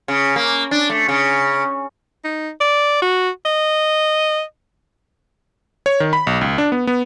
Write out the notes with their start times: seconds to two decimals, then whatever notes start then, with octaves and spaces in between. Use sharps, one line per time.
0.08 C#3
0.36 A#3
0.71 D4
0.90 A3
1.08 C#3
2.24 D#4
2.61 D5
3.02 F#4
3.45 D#5
5.86 C#5
6.00 D#3
6.13 B5
6.27 B1
6.41 C#2
6.58 D4
6.72 B3
6.87 B3